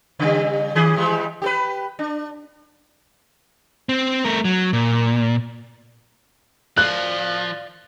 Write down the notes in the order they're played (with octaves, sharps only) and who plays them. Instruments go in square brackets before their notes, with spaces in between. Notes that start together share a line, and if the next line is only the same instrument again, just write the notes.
[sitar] C#3 G3
D#3 G#4
E3 G3 G#3
G4 A4 B4
D4
[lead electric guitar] C4
A3 A#4
F#3
A#2
[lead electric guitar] F3 [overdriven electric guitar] D5 F5 [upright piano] F#6